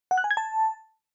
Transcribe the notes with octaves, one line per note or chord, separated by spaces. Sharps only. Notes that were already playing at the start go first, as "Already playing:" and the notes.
F#5
F#6
G#5
G#6
A5